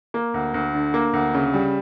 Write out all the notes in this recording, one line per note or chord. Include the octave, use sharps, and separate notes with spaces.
A#3
D2
D2
D3
A#3
D2
C#3
G3